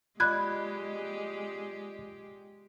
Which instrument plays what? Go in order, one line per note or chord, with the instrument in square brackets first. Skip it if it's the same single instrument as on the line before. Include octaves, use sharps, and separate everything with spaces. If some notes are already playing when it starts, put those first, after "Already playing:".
[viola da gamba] G#3 G4 [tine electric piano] F4 D5 D#5 [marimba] B5 F#6 G#6